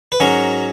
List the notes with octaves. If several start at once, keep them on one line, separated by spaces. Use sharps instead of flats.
B4
G#2 F#3 C#4 F#4 A#4